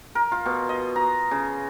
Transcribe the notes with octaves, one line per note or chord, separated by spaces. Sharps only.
A#4
F4
B2
D#5
A#5
C#3